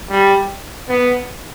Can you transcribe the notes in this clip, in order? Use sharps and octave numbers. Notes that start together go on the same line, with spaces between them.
G3
B3